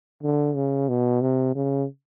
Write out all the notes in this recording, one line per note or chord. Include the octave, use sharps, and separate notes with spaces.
D3
C#3
B2
C3
C#3